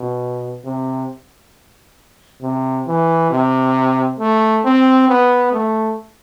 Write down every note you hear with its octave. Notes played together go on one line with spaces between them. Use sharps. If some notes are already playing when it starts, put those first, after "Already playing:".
Already playing: B2
C3
C3
E3
C3
A3
C4
B3
A3